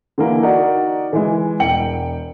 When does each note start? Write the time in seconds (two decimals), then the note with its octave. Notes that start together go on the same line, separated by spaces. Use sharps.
0.18 D3 E3 A#3
0.43 D#4 F#4 A#4 D5
1.13 E3 G#3
1.60 E1 G5 C#7 F#7